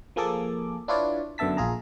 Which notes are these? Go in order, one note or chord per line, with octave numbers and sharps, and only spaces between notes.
F3 A#3 G#4 A4 D6
D4 E4 F4 B4 C#5 D5
F#2 D3 B3 E5 A5 B6
A#1 F4 G#4 A#5